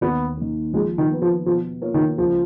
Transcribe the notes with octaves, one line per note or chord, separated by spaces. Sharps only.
D#2 B3
D#3 A#3
F3 G#3
D#3
B3 F4 B4
F3
B2 F3
A#3 F4 A#4 C#5
D#3
C#2 F3